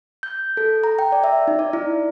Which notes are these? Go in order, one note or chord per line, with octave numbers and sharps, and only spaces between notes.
G6
A4
A#5
G5
D5
E5
D#4
D5
E4